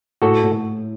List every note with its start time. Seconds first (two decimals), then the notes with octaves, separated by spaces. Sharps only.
0.22 A2 F#4 A4
0.43 A2